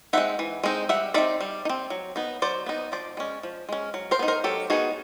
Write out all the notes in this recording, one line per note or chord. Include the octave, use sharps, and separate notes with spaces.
G#3 C4 D#4 E5 F#5
E3
G#3 C4 D#4
G3 E5 F#5
C4 D#4 D5 E5
G3
D#4
C4
F#3
B3 D#4
F#3 C5 D5
B3 D#4
F3 C5 D5
G#3 C#4
F3
G#3 C#4
F#3
A#4 C5
B3 D#4
A#4 C5
F#3 G4 A4
B3 D#4 F#4 G#4